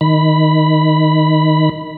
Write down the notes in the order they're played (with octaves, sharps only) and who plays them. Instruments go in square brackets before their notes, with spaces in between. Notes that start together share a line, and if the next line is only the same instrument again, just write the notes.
[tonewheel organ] D#3 B5